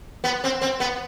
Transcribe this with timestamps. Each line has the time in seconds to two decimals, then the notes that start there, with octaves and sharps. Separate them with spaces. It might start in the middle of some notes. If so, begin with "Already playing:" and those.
0.24 B3
0.44 C4
0.62 C4
0.80 B3